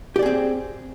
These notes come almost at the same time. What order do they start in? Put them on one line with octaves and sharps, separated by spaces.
G4 D5 G#4 C4